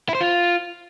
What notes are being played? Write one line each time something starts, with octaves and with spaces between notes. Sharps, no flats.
E4
C5
F4